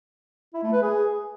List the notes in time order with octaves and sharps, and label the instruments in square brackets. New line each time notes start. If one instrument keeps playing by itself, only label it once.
[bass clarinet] E4
A3
B4
G#4